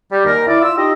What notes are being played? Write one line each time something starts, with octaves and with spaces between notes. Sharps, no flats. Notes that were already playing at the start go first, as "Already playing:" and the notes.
G3
D#2 A#4
E4 D5
F4 E6
D#4 G4 D#5